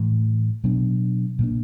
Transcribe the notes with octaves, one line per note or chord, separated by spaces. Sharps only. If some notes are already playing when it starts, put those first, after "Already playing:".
Already playing: A2 E3 A3
B2 F#3 B3 D4
A#2 G3 A#3 D4